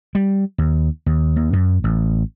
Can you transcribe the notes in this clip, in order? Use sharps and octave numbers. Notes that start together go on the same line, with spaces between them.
G3
D#2
D#2
D#2
F#2
A1